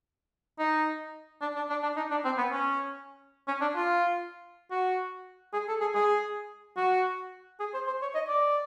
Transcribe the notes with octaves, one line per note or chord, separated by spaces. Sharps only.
D#4
D4
D4
D4
D4
D#4
D4
C4
B3
C#4
C#4
D4
F4
F#4
G#4
A4
G#4
G#4
F#4
G#4
C5
C5
C#5
D#5
D5